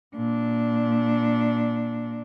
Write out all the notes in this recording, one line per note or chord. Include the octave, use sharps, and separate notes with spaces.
A#2 D4